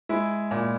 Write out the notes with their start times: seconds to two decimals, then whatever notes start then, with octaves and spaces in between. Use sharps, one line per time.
0.09 G#3 E4
0.51 A#2